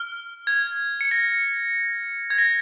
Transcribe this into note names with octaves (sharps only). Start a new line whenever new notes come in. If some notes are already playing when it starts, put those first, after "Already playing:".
Already playing: F6
G#6
C#7
A#6
G#6
A#6